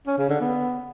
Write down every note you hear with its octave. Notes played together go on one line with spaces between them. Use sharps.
C#4
C#3
D3
B3